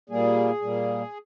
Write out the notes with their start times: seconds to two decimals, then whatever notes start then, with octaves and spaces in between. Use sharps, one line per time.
0.10 A#2 G3 A#3 G#4
0.62 A#2 G3 A#3